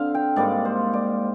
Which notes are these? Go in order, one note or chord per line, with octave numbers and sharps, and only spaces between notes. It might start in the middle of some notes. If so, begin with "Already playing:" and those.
Already playing: D3 C4 F5
G5
G#2 G3 A#3 D5
C5
D5